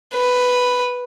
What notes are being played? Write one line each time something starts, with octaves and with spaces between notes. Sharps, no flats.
B4